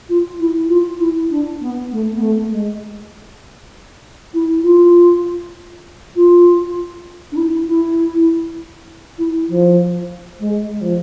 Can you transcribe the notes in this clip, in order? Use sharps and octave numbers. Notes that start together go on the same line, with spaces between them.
F4
E4
F4
E4
D4
B3
A3
B3
A3
G#3
E4
F4
F4
D4
E4
E4
E4
F3
G#3
G#3
F3